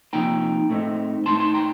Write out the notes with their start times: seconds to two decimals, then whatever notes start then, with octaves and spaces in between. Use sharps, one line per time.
0.13 C3 F3 A#3 D#4 G5 A#5
0.69 A2 A3 C4 D#4
1.26 A2 A3 D#4 A5 C6
1.40 A5 C6
1.54 G5 A#5